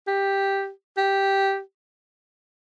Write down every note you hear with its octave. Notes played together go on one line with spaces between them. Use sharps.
G4
G4